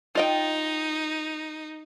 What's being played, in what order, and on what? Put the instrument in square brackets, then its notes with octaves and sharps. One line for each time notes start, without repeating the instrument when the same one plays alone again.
[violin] D#4 [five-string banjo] F4 D#5 G5